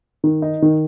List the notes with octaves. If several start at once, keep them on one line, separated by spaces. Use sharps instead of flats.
D#3
D#4
D#3